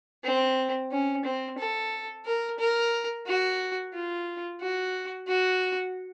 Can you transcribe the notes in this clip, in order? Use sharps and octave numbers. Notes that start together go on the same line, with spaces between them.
C4
C#4
C4
A4
A#4
A#4
F#4
F4
F#4
F#4